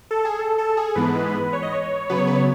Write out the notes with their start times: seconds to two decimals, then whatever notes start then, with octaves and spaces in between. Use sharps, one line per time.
0.11 A4
0.25 G#4
0.39 A4
0.58 A4
0.77 G#4
0.95 G#2 E3 G#3 B3 B4
1.53 C#5
1.63 D#5
1.72 C#5
2.09 C#3 F#3 B3 B4
2.18 C#5
2.27 B4
2.36 C#5